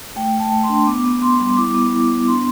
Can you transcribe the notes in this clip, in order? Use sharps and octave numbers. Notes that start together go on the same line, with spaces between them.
A3 G5
A3
A5
A3
C6
D4
B3 D6
B3
B3 C6
G3
E4 D6
B3
E4
B3
D4 C6